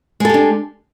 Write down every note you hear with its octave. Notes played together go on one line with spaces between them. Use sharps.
G#3 D4 G4 A4